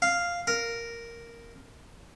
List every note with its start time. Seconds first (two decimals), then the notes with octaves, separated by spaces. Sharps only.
0.02 F5
0.47 A#4